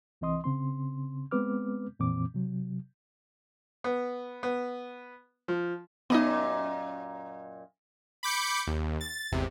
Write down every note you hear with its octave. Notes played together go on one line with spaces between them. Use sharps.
C2 E3 C4 D#5 C6 D#6
C#3 C4 C6
G#3 B3 C4 B4 D6 F6
F2 A#2 E3 C4 D6
C3 F#3
B3
B3
F3
F#2 A#2 B3 D#4 D#5
B5 D6 G6 C#7
D#2
A6
G#1 E2 C3